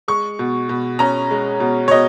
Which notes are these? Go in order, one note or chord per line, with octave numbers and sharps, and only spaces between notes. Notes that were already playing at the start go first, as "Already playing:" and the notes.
G#3 C#6
B2
B2
C#4 A#5
G#3
B2
C#5
B2 D#5